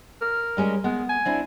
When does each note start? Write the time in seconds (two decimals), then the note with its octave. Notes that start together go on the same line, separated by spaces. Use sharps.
0.22 A#4
0.57 G3 G#3 C#4
0.84 G#3 B3
1.09 G#5
1.25 C4 D4 E4